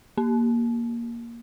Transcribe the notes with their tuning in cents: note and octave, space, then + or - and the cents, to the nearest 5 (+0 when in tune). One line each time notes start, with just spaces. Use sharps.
A#3 +10